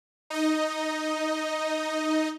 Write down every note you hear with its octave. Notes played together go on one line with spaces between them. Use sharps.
D#4 D#5